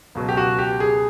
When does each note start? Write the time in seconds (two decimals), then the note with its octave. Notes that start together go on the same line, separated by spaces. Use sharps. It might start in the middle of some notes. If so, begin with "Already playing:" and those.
0.15 C#2 B2 F#3
0.29 G4
0.37 F#4
0.59 G4
0.80 G#4